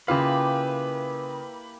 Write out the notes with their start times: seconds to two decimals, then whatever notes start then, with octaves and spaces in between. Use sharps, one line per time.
0.08 C#3 A#3 E4 F4 G4 B4 F5